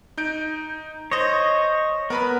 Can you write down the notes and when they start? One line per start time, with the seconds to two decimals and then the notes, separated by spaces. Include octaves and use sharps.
0.17 D#4 G6 D7
1.11 C5 C#5 D#5 D#6 A#6
2.10 B3 A#4 B4 B5